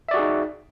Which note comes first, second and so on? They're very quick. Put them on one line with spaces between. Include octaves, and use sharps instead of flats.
E5 D5 F#4 G#4 D#4